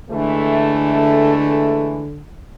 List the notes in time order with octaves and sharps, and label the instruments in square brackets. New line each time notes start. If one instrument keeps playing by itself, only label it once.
[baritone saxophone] D3 [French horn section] E3 G#3 A3